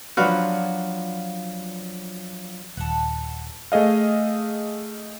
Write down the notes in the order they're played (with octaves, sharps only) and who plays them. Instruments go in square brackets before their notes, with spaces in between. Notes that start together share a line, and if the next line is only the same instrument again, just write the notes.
[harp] F3 F#3 D4 [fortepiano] F#4 B4 F5
[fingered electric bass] D#1 [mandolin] A4 F#5
[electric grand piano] A3 G#4 D#5 F5